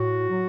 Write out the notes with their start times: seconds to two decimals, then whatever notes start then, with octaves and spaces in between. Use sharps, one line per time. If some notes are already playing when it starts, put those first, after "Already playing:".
Already playing: A2 F#4
0.29 F#3